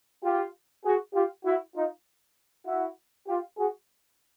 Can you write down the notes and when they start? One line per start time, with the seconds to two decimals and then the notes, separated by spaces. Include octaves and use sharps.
0.23 F4 G4
0.84 F#4 G#4
1.14 F4 G4
1.45 E4 F#4
1.75 D#4 F4
2.66 E4 F#4
3.27 F4 G4
3.57 F#4 G#4